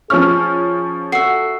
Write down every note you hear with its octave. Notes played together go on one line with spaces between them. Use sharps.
F3 C#4 G#4 C#6 F6
F#4 A4 E5 C7